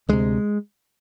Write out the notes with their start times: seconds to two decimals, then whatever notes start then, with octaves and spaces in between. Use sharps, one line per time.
0.09 D2 C3 G#3